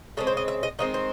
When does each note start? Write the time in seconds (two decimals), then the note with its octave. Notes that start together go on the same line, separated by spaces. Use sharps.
0.17 C#3 G#3 C4 A4
0.27 C5
0.37 D#5
0.48 E5
0.63 D#5
0.79 D#3 G#3 C4 D#5
0.94 C5